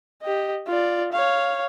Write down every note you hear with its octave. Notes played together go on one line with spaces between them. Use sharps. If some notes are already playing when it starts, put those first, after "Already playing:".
G4 D#5
F4 D5
C#5 F5